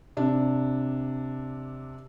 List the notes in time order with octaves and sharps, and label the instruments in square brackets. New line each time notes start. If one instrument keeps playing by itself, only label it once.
[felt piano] C3 D4